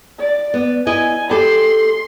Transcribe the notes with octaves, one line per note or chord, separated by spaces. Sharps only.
D5
B3
E4 D#5 G#5
G4 A4 C6